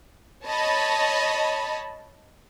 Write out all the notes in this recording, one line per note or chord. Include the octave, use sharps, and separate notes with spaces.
C#5 D#5 A5 B5